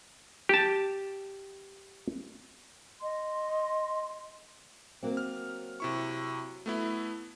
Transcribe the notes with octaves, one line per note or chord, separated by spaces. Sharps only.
G4 A5
D#5 C6
F#3 A#3 C4
F6
C3 E4 C#6
A3 B3 E4